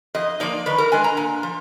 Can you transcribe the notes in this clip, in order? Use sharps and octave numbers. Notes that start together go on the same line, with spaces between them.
F2 D#5
F3 A#3 D#4 D5
D#3 B4
A#4
G#3 D4 G#5
A#5
A#2 G#5
F3